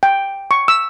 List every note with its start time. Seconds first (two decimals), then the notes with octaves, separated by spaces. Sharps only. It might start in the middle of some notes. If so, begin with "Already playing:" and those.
0.03 G5
0.51 C#6
0.68 E6